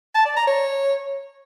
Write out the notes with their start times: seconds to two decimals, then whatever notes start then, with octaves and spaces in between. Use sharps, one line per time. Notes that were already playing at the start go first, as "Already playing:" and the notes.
0.15 A5
0.25 D5
0.36 A#5
0.47 C#5